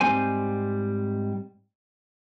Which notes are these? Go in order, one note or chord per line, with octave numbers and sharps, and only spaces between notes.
G#2 G3 C4 C5 G#5